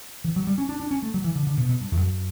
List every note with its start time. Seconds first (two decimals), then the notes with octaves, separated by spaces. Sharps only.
0.24 E3
0.36 F#3
0.47 G3
0.58 C#4
0.69 D4
0.80 D4
0.91 C#4
1.03 A3
1.14 F#3
1.24 E3
1.36 D3
1.47 D3
1.57 B2
1.69 B2
1.81 G2
1.92 E2
2.02 F#2